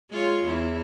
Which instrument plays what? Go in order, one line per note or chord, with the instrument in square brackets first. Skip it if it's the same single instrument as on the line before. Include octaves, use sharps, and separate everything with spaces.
[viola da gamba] G#3 F4 C#5
E2 E4